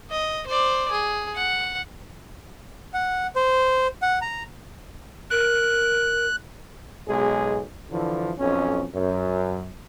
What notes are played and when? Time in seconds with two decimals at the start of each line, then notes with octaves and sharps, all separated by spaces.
0.11 D#5
0.47 C5 D5
0.90 G#4
1.35 F#5
2.94 F#5
3.36 C5
4.02 F#5
4.22 A#5
5.31 A#4 F#6
7.08 B1 B2 G#3 G#4
7.90 D3 E3 F3 E4
8.39 B1 F2 C#4
8.94 F#2